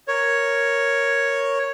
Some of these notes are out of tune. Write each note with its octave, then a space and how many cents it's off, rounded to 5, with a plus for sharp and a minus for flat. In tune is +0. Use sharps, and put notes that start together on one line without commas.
A#4 +0 C#5 +0